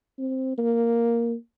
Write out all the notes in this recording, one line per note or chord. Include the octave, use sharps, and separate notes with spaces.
C4
A#3